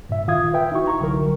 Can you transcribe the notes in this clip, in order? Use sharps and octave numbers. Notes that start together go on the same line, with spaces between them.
G2 A#2 E5
D#3 F4 F5 D#6 G#6
B4 E5 G5
D#4 E4 F#4 C#6
A#5 C#6
C2 D3 F#3 A#4